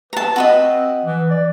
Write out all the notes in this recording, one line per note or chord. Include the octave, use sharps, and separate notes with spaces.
B4 A5 A#5
C4 F#4 B4 D#5
E3
D5